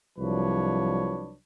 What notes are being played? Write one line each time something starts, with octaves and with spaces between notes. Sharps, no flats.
C2 F3 F#3 D4 B4 C#5